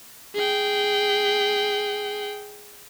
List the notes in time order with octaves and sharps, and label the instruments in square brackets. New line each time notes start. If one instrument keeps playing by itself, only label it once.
[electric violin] G#4 G5